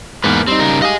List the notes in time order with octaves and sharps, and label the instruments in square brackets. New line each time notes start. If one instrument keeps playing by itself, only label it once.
[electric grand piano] E2 G#2 [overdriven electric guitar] A#3 B4
[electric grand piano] G3 D#4 [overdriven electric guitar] C4
[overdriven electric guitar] C#3 A#4
[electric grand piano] G4 F5 D#6 [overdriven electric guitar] D#5 G#5